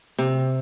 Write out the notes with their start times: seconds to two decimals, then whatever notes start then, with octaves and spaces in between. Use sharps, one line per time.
0.18 C3